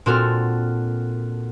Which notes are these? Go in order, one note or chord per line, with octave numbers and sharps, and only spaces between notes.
A#2 C4 D4 F#4 A4 F6